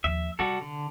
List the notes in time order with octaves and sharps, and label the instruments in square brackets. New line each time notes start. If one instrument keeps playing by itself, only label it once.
[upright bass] D#2 F3 [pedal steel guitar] E5
[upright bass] C3 [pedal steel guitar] G3 F#4 A4
[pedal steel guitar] D3